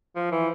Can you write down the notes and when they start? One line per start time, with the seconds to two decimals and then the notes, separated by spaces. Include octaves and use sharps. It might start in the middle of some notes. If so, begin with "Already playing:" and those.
0.16 F3
0.32 E3